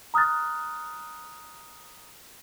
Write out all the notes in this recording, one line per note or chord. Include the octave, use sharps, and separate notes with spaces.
A#5 D#6 F6 F#6 A6